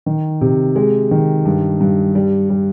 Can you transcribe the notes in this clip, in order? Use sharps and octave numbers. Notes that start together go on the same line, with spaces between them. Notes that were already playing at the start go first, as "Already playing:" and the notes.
D#3
C3
G#3
D#3
G2
G2
G3
G3